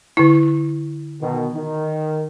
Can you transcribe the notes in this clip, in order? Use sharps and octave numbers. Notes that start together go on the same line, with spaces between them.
D3 E4
B2 D#3
D#3